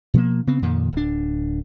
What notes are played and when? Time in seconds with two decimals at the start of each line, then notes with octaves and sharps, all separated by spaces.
0.14 B2 F3 A3 A#3
0.47 C#3 B3 C4
0.62 F2 A#2 D#3
0.93 D1 D4